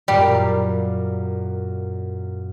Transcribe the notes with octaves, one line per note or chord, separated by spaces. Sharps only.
F#2 A#2 G3 G4 F5